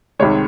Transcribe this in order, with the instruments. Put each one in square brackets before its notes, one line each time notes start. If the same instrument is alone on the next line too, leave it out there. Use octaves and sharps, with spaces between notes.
[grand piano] C2 C3 D#3 G#3 C#5